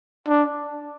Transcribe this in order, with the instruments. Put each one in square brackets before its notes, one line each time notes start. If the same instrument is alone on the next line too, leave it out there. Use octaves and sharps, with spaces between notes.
[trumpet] D4